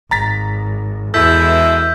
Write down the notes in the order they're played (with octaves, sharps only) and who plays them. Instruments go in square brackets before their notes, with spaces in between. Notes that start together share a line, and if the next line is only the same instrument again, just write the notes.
[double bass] G#1 [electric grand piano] A#5 A6 B6
[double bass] E2 [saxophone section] B2 G#3 E4 [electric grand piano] A4 [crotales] E6 G6 B6